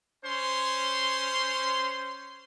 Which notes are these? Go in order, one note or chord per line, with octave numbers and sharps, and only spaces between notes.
C#4 C5 C6